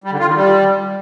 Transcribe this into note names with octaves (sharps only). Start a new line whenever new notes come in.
G3
D3
F4
D#3
G3